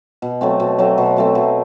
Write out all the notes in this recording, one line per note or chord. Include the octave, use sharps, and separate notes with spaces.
B2
F#3 A3 C4
B2
F#3 A3 C4
B2
F#3 A3 C4
B2